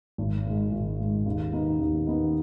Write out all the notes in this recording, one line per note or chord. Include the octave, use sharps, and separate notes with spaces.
G#1
G#2 G#3
G#1
G#2 G#3
D#2
D#3 B3 D#4
D#2
D#3 B3 D#4